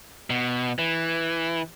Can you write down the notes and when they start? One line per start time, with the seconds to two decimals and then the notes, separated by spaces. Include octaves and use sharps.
0.30 B2
0.79 E3